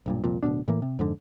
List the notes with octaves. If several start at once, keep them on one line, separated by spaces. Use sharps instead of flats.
B1 G2 A#2
C2 F2 A#2
D1 B1 B2 D4
A2 E3 A#3
C3
F2 G#2 D3